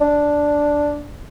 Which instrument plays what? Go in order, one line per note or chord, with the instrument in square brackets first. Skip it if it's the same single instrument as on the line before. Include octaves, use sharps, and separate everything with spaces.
[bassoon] D4